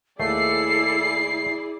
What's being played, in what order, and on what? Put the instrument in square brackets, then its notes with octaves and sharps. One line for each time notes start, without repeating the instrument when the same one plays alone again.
[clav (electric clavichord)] D#2 A3 [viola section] E4 G#4 D5 [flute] A4 [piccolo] C7